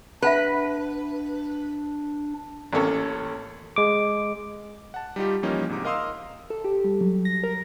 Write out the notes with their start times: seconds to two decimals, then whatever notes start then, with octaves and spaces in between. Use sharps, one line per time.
0.22 D4 B4 E5 F#5 B5
2.73 A1 A#3 C#4 A4 C#5
3.76 G#3 D6
4.94 F#5 A5
5.16 G3 D#4 F4 G4
5.43 E3 F3 G3 A#3 C#4 D#4
5.69 G#2 C3 D#4 D6
5.84 A#4 D#5 F5 C6 D#6 E6
6.50 A4
6.64 G4
6.84 G3
7.01 F#3
7.25 A#6
7.43 A#4